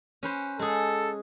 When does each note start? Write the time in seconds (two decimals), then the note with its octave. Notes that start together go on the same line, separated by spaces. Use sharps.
0.23 C#4 B4 C5
0.59 G#3 G#4 A4